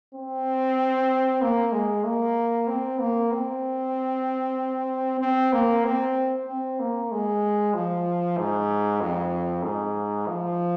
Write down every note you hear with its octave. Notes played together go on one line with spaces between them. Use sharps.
C4
A#3
G#3
A#3
C4
A#3
C4
C4
A#3
C4
C4
A#3
G#3
F3
G#2
F2
G#2
F3